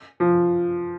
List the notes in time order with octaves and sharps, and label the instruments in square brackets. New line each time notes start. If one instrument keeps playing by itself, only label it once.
[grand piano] F3